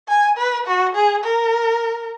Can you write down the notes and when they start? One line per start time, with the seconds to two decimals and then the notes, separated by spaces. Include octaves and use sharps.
0.08 G#5
0.37 B4
0.67 F#4
0.95 G#4
1.24 A#4